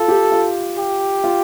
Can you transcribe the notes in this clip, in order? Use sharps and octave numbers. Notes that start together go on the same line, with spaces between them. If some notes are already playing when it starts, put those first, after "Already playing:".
Already playing: F4 A4
G4
F4
G4
F4